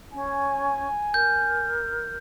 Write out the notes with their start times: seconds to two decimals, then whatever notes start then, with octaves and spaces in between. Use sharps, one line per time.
0.13 C#4 G#5
1.14 A#4 G6